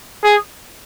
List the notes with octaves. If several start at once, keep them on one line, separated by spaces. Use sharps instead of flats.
G#4